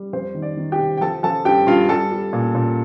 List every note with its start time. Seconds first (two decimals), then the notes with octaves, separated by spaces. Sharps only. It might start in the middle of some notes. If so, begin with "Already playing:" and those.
Already playing: G3
0.13 F2 C5
0.35 D#3
0.42 D5
0.57 D#3
0.72 G4 G5
0.79 C3
0.97 G5
1.01 F3 A4 A5
1.23 F3 A4 A5
1.45 G2 G4 G5
1.67 G2 F4 F5
1.89 G3 A4 A5
2.12 G3
2.33 A#2
2.55 A#2